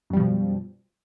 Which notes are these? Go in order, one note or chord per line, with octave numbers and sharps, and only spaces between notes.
F#2 B2 F3 G3